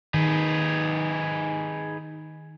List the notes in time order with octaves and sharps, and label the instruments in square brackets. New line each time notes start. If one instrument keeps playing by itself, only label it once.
[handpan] D#3 [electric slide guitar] D#4 G#4 B4